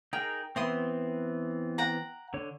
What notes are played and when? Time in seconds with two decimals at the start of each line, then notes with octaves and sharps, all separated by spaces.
0.13 D#4 G#4 A#4 G5
0.56 E3 B3 C4 E4 C6 D#6
1.78 F#5 G5 A#5
2.34 D3 C#5